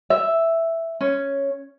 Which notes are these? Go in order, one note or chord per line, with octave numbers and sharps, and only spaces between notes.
E5
C#4